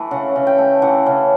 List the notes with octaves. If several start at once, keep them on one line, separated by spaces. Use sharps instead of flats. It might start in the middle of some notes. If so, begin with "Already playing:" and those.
Already playing: E3 A3 B4
C#3 F#5
C#3
G5
A3
E3 F#5
C#3